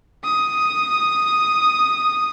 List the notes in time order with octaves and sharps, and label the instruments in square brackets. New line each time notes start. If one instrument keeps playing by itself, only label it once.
[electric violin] D#6